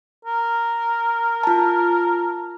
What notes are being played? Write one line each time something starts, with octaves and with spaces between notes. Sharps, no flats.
A#4
F4 A5